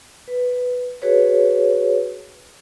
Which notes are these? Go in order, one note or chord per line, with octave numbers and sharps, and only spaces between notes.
B4
F#4 G#4 B4 C#5